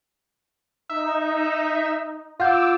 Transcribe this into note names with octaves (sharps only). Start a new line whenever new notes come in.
D#4 E5
F4 F5 F#5 D6 E6 G6